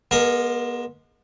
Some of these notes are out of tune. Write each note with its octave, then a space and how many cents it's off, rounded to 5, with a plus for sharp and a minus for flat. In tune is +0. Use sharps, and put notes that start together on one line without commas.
G#3 +10 B3 -35 A#4 +0